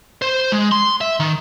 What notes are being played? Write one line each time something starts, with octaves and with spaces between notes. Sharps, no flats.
C5
G#3
C6
E5
D#3